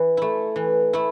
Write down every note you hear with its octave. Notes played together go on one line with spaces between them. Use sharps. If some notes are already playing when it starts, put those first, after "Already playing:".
Already playing: E3
A3 E4
E3
A3 E4